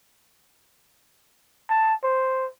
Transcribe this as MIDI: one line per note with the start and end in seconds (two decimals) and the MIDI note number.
1.70 1.94 81
2.03 2.46 72